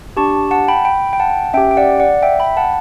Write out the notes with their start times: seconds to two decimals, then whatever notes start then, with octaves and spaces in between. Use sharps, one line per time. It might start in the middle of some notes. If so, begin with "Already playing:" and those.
0.17 D4 G4 A5 C#6
0.51 F#5 A5
0.68 G5 B5
0.85 G5 B5
1.13 G5
1.20 F#5 A5
1.54 C#4 G4 E5 G5
1.71 G5
1.77 D5 F#5
2.00 D5 F#5
2.23 E5 G5
2.40 G5 B5
2.57 F#5 A5